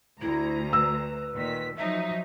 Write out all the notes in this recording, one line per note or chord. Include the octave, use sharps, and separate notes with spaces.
D2 E4 A#5
B4 E6
A#2 D#3 B6
F3 F#3 D#4 E5